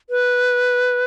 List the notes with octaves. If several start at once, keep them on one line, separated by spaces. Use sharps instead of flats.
B4